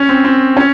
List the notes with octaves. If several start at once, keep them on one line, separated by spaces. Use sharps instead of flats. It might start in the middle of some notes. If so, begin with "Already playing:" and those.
Already playing: C#4
C4
C4
C#4